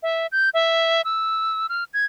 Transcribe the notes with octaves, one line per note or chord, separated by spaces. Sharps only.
E5
G6
E5
E6
F6
G#6